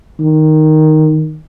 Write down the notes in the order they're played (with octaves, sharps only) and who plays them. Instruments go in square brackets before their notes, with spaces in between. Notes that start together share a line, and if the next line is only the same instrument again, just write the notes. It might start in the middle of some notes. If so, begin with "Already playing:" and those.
[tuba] D#3